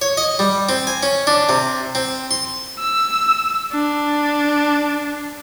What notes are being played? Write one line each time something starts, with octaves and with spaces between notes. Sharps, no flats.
C#5
D#5
G3
C4
G#5
C#4
D4
C3
C4
C6
E6
D4